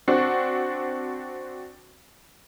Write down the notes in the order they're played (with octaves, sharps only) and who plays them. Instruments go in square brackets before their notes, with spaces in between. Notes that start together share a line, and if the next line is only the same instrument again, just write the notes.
[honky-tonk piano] C4 D4 F#4